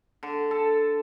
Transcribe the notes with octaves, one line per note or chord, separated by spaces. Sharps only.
D3
A4